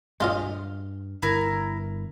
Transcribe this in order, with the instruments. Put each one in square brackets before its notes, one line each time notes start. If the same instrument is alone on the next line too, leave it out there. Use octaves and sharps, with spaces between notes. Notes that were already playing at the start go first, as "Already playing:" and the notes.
[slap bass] G2 [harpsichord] G#3 F4 D#5 [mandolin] F6
[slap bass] G1 [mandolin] E4 A#4